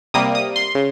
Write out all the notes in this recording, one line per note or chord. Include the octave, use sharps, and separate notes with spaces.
C3 G3 A#3 D#6
D#6
C6
C#3